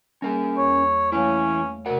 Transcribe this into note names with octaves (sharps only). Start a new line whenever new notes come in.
G3 A#3 C#4 G#4 A#4 G#5
E2 C#5
E3 A3 C#4 E4 C#5 F5
C3 F#4 A#4 D5 F#5